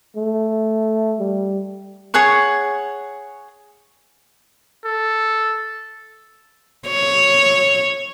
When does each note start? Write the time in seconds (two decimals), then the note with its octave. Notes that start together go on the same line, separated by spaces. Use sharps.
0.16 A3
1.19 G3
2.14 G#4 C#5 F#5 C#6
4.85 A4
6.89 C#5